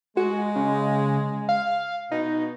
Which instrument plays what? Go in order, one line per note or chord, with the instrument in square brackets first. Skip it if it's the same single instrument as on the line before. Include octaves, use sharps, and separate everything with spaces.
[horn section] G#3 [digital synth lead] F#4
[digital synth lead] C#3
F5
[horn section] B2 [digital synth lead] D#4